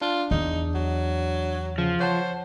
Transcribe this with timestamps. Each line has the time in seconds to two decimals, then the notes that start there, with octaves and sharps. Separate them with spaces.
0.01 D4 F4
0.31 E2 D#4
0.74 F#3
1.78 C#3 F3
2.00 C5 C#5 F#5 A5